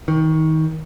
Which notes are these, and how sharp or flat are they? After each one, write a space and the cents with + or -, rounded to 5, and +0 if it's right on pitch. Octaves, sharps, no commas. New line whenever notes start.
D#3 +25